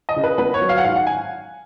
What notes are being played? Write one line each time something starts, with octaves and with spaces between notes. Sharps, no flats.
D#5
C#3
B4
B3 B4
C#5
F#3
F5
F#5
G#2 F5
F#5
G#5